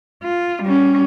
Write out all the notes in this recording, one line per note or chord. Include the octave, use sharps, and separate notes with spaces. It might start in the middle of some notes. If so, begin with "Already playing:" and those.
F4
G3 C#4